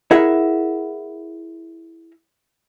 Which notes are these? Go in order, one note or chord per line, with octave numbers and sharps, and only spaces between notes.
E4 G#4 A#4 E5 F#5